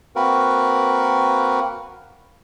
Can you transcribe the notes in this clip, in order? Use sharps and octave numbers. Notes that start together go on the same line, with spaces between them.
A#3 C4 F#4 A#4 B4